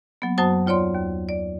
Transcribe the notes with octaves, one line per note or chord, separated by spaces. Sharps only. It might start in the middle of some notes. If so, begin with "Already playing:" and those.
F#3 A#3 B3
F#2 F#3 F#4 C5 A5 D#6
D#2 F4 C#5 D5 C6
D#2
D5